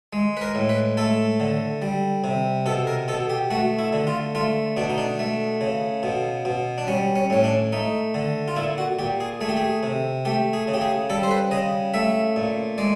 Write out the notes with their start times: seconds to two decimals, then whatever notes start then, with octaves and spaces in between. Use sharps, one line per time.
0.13 G#3
0.37 B4
0.41 A#4
0.55 A2
0.69 B4
0.97 A3 A4
1.40 D3
1.82 G3
2.24 C3
2.66 B2 A4
2.87 A#4
3.08 B2 A4
3.30 G4
3.51 A3 F#4
3.79 E4
3.93 D3
4.07 F4
4.35 A3 F4
4.77 B2 D4
4.90 D#4
4.98 D4
5.19 A3
5.61 C#3
6.03 B2
6.45 B2
6.78 D4
6.87 G3 C#4
7.15 C#4
7.30 A2 C#4
7.44 D4
7.73 A3 D#4
8.14 D3
8.48 F4
8.56 A#2 E4
8.78 F#4
8.99 A#2 G4
9.20 G#4
9.41 A3 G#4
9.49 G4
9.57 G#4
9.83 C3
10.25 A3 G4
10.53 G#4
10.68 C#3
10.74 G4
10.81 G#4
11.10 G3 A4
11.23 C5
11.31 B4
11.51 C#3 D#5
11.94 A3 E5
12.36 A#2
12.78 G#3 D5